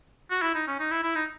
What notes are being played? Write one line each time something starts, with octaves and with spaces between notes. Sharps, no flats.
F#4
E4
D#4
C#4
D#4
E4
E4
D#4